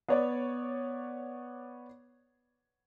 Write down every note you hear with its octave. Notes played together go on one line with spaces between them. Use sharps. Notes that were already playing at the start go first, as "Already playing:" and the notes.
B3 C#5 D5